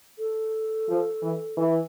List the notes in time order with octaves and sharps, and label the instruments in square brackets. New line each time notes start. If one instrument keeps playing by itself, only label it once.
[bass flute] A4
[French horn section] F3
E3
E3